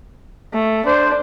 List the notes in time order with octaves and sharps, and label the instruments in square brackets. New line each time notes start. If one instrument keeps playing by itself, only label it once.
[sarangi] A3
[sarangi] D4 [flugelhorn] C5